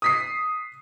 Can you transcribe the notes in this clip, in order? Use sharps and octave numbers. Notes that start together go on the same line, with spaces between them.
D#6 B6 C7